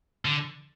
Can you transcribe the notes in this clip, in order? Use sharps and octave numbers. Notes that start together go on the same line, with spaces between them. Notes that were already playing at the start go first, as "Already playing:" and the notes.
D3